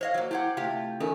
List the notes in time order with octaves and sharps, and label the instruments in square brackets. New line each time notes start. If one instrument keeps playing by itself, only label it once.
[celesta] C5 [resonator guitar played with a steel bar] C#5 D#5 F5
[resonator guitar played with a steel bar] F#3 A#3
[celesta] E4 G#6 [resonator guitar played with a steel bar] G4 C5 F#5
[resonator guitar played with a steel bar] C3 F4 G4 [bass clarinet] A3
[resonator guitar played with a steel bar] E2 D#4 [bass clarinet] C#4 [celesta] A4 A#4